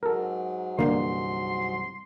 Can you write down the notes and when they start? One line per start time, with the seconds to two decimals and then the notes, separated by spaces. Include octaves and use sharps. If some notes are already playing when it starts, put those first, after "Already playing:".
0.03 G#2 F#3 G#3 A4 A#4
0.79 C2 G2 D3 A#3 C6